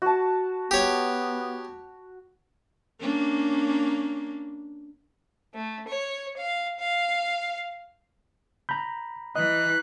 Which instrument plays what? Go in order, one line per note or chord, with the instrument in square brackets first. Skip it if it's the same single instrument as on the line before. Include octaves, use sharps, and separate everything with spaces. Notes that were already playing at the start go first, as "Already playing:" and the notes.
[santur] F#4 A5
[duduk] B3 [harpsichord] G4 C#5
[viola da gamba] A#3 C#4 D4
[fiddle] A3
C#5
F5
F5
[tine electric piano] A#5 B5 [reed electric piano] G6
[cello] E3 [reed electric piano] D#5 [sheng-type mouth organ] F#6